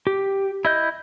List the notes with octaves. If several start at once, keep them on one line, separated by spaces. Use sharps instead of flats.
G4
E4 D#5 G6